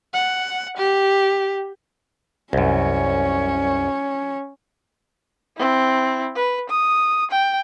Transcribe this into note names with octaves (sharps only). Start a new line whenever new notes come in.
F#5
G4
C2 F#2 C#4 C#5
C4 E4
B4
D#6
G5